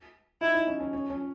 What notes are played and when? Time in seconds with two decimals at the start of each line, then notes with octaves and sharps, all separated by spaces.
0.41 D#4 E4
0.54 D#4
0.67 C#4
0.80 C#4
0.93 C#4
1.10 C#4